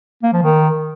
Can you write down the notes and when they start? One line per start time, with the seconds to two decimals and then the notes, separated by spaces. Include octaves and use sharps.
0.23 A#3
0.33 F3
0.43 D#3